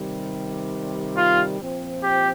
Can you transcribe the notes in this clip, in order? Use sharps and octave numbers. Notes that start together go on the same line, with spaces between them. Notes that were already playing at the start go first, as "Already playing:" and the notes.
Already playing: C3 D#3 G3
F4
A#2 F3 C4
G4